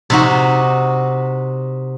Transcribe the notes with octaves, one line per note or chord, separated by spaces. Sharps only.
C3 D#4 F#4